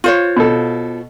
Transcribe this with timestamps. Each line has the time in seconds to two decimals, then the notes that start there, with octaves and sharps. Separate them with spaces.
0.04 F4 C5 C#5
0.37 B2 A4